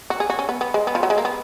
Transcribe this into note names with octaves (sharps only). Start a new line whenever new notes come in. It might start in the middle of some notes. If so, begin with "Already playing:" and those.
F#4
G#4
F#4
C#4
B3
B3
G#3
B3
F3
F#3
G#3
A#3
B3